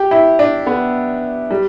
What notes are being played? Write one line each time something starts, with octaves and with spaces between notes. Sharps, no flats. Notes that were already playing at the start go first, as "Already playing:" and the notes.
Already playing: G4
E4
D4
B3
G3